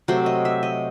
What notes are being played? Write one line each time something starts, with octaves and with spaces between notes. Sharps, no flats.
C3 F#3 A3 C5
D#5
E5
D#5